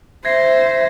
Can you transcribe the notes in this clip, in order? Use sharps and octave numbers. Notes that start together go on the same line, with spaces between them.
C5 E5 G#6 A#6 C7